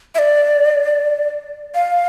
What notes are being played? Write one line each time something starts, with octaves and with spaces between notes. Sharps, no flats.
E5
D5
F5